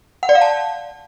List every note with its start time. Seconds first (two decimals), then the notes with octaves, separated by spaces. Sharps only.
0.23 F#5
0.29 D5
0.35 F5
0.41 A5